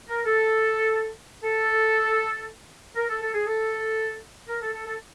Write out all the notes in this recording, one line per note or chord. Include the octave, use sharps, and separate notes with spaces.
A#4
A4
A4
A#4
A4
A4
G#4
A4
A#4
A4
A4
A4